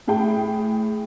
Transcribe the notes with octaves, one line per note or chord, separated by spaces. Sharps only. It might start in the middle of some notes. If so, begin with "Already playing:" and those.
A2 G#4 G5